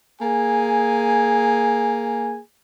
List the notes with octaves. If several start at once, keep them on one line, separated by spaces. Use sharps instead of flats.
A#3 G#4 G#5